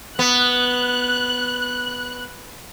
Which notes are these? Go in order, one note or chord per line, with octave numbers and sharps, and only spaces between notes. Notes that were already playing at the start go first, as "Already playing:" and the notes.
B3 F#6